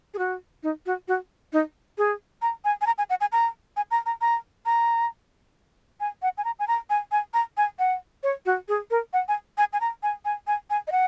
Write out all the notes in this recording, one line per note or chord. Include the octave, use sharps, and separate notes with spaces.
G#4
F#4
D#4
F#4
F#4
D#4
G#4
A#5
G#5
G#5
A#5
G#5
F#5
G#5
A#5
G#5
A#5
A#5
A#5
A#5
G#5
F#5
G#5
A#5
G#5
A#5
G#5
G#5
A#5
G#5
F#5
C#5
F#4
G#4
A#4
F#5
G#5
G#5
G#5
A#5
G#5
G#5
G#5
G#5
D#5
F#5